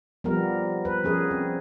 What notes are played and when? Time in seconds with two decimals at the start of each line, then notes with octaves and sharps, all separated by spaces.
0.24 F3 G3 B3 A#4
0.85 B4
1.04 F3 C#4 G#4 A#4
1.31 C4